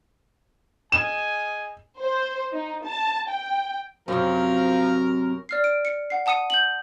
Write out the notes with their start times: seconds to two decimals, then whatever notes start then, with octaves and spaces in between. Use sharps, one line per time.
0.92 G#4 D#5 G#5 E7
1.98 C5
2.52 D#4
2.83 A5
3.27 G5
4.08 F#2 C3 F3 F#3 A#4 C#5
5.49 D5 F6 C7
5.64 D7
5.85 C#7
6.10 F#5 C7
6.26 F#5 A5 D#6 C#7 D#7
6.50 G6 F#7